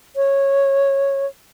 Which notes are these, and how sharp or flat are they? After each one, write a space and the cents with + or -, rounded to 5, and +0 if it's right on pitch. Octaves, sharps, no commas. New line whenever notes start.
C#5 -10